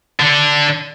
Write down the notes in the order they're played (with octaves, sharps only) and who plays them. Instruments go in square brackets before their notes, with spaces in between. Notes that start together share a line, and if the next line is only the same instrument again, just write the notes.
[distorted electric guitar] D3 D4